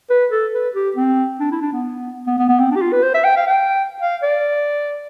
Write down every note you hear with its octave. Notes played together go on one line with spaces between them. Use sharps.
B4
A4
B4
G4
C4
D4
E4
D4
B3
B3
B3
B3
C4
D4
G4
F4
B4
C5
E5
G5
F5
G5
F5
D5